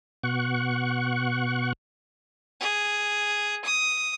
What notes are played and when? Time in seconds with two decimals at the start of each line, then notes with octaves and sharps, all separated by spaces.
0.23 B2 F#5 C#6
2.61 G#4
3.64 D#6